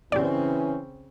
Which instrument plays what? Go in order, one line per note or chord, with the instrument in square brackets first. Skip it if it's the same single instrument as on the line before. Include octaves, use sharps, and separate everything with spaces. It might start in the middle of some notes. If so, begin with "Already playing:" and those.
[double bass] C#3 C4 [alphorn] E3 [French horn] C#4 [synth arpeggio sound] G4 D5